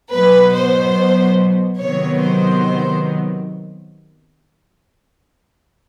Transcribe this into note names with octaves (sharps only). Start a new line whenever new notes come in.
B2 F#3 B3 B4
C5
C3 D#3 F#3 B3 C#5
C5